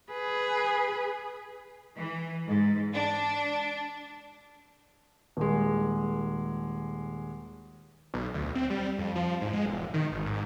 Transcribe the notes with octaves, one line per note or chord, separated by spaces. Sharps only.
G#4 B4
E3
G#2
D4
D#1 G#3
B1
D2
C4
G3
F2
F3
G#2
G#3
E1
D#3
G#1
G#2